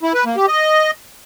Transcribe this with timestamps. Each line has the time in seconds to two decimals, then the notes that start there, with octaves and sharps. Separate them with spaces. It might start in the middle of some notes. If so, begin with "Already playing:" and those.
0.03 E4
0.14 B4
0.25 A#3
0.36 G4
0.48 D#5